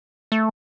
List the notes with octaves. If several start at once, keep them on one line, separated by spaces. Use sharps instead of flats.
A3